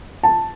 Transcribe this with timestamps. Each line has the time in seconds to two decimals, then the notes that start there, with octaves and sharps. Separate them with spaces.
0.23 A5